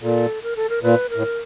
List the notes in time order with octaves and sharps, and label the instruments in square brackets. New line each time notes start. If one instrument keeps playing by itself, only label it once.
[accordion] A#2 [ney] A4
[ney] A#4
A4
A#4
[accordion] A#2 [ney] B4
[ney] A#4
[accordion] A2